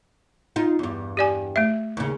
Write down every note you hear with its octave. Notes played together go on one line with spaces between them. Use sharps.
D#4 F4
E2 G2
G4 D5 G#5
A3 E5
D#2 C#3